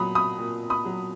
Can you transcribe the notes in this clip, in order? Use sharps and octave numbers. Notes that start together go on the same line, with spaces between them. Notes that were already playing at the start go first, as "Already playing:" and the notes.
Already playing: A#2 F#3 B5 D#6
B5 D#6
A#2
B5 D#6
F#3